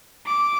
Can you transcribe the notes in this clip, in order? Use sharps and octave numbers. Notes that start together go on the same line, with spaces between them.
D6